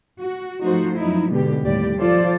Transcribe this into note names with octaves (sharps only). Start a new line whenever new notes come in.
F#4
F3 A3 D#4 F#4 C5
F#2 F3 D#4 E4
G#2 B2 D3 B3 G4
D#2 A2 G3 G4 D5
F3 F4 A4 C5 D5